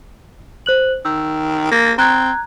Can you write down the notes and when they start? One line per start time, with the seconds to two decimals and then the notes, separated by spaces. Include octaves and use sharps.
0.66 C5 F#6 F#7
1.05 D#3 E6
1.71 A#3
1.98 C4 A#5 F#6 G#6